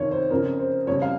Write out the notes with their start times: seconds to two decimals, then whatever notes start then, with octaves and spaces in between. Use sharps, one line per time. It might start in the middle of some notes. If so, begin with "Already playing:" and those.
Already playing: F1 F2 D#3 C#5
0.11 C5
0.30 F2 C#3 F3 A#4
0.59 C5
0.87 F2 C#3 G3 C#5
1.02 F5